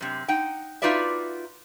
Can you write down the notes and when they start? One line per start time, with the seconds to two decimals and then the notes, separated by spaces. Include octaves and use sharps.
0.01 F#2 C3
0.28 D#4 F#5 G5
0.82 D#4 F4 F#4 B4 D5 E5